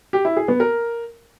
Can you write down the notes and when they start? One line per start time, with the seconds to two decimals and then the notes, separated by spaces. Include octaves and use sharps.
0.13 G4
0.25 E4
0.37 G#4
0.48 B3
0.60 A#4